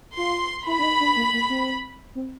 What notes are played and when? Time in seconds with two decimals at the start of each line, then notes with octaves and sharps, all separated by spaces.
0.17 F4 C6
0.67 E4 B5
0.79 D4
0.83 D#4
1.00 D4
1.16 A#3
1.33 A#3
1.50 C4
2.15 C4